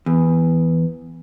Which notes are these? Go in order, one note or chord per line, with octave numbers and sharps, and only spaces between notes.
E2